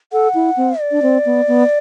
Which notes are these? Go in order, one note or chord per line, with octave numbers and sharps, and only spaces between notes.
A4 F#5
E4
C4
D5
D4
C4
B3
B3